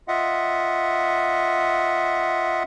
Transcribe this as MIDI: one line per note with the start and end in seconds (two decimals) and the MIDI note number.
0.08 2.63 65
0.08 2.63 75
0.08 2.63 76
0.08 2.63 78